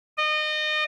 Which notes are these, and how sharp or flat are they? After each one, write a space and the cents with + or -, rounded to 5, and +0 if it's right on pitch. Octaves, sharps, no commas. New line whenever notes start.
D#5 -30